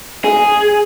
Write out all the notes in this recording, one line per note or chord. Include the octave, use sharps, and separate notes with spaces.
G#4